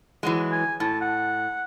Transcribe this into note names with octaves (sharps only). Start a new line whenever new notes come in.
E3 F#3 G#3
G#5
A2 A5
F#5